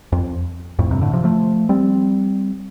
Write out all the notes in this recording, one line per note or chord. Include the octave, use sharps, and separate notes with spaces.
F2
F2 A2
G2 C3
A2 D3
C3 F3
F3 A3
G3 C4